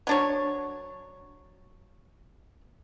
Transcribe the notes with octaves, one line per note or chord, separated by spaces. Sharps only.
F#3 D4 C#5